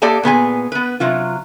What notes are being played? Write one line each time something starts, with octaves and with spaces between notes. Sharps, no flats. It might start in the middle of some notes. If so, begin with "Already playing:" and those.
A#3 G4 A4 D5 D#5 A5
A#2 B3 G#4 G#5
B3 B4
C3 F#3 F4